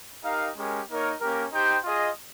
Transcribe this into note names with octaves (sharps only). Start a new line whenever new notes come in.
D#4 G4 A#4 F5
G#3 C#4 G4 A#4
A#3 D#4 A#4 C#5
A#3 C#4 G4 A#4
D#4 G4 C5 G5
F4 G#4 D#5